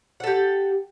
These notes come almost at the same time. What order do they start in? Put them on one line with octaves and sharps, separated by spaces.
F#5 A4 G4